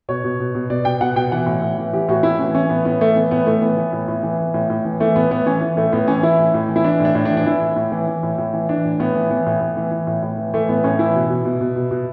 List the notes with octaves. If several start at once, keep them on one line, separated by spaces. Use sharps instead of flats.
B2 C#5
B2
B2
B2
B2 D5
B2 G5
B2 F#5
B2 G5
E3 F#5
A2
A2
E3
E3 G4
A2 F#4
A2 E4
E3 C#4
E3 C#4
A2 B3
A2 B3
E3 A3
E3 B3
A2 B3
A2 A3
E3 B3
E3
A2
A2
E3
E3
A2
A2
E3
E3 A3
A2 B3
A2 B3
E3 C#4
E3
A2 A3
A2 B3
E3 C#4
E3 E4
A2
A2
E3
E4
E3 D4
A2 D4
A2
D4
E3
D4
E3 E4
A2
A2
E3
E3
A2
A2
E3
E3 D4
A2
A2 B3
E3
E3 B3
A2
A2
E3
E3
A2
A2
E3
E3 A3
A2 B3
A2 C#4
E3 E4
B2
B2
B2
B2
B2
B2